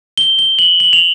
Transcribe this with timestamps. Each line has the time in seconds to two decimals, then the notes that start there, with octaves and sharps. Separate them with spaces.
0.18 G7
0.39 G7
0.59 F#7
0.80 F#7
0.93 F7